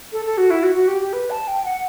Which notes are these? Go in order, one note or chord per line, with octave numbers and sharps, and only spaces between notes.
A4
A4
F#4
E4
F#4
F#4
G4
G4
B4
A5
G5
F#5